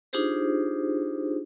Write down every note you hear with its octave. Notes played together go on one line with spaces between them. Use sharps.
D4 D#4 F4 G4 G#4 C5